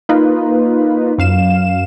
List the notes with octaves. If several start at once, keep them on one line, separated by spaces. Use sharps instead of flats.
A#3 D#4 F4 B4
F#2 F5 E7